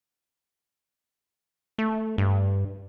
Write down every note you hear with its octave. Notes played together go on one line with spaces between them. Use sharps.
A3
G2